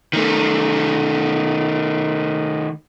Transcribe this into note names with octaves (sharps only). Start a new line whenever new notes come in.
D#3 A3